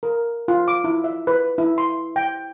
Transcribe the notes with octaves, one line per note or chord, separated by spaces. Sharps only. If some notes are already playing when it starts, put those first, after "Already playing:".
A#4
F4
D6
E4
E5
B4
E4
C6
G5